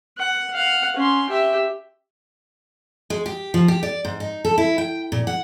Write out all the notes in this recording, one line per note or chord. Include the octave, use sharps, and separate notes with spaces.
F#5
F5 F#5
C#4 C6
G4 E5
G#3
G4
F3
G4
D5
G#2
D#4
A4
E4
G5
A#2
F#5